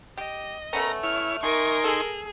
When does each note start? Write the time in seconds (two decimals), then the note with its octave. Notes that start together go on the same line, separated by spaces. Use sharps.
0.17 G4 D#5
0.73 A3 B3 C#4 A#4 A#5
1.03 E4 C#5 F6
1.43 D#4 A#4 G#5 C6 C#6
1.84 G#4 A4